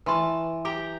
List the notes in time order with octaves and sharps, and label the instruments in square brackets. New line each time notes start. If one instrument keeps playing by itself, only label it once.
[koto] E3 A5 [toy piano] B4 C6 C#6
[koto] G4 G5 A#5 [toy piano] D6